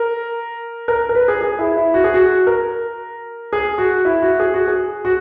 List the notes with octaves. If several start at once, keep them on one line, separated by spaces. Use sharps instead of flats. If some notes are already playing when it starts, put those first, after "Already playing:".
Already playing: A#4
A#4
A#4
B4
G#4
G#4
E4
E4
F#4
G#4
F#4
A#4
G#4
F#4
E4
F#4
G#4
F#4
G#4
F#4